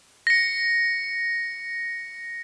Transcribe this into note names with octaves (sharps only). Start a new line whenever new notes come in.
A#6 C#7